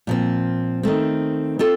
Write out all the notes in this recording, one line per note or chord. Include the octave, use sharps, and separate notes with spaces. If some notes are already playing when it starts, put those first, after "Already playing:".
A#2 F3 C4
D#3 A3 C4
C4 F4 A4